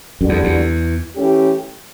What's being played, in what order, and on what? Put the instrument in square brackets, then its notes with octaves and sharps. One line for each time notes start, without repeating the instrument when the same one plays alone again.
[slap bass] F#2 [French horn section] D3 G3 D4 F#4 A4
[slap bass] E2
E2
[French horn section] E3 A3 C#4 G4